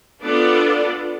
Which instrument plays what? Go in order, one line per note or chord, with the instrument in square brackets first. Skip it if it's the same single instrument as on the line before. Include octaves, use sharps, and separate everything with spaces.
[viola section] B3 D4 F4 A4 D5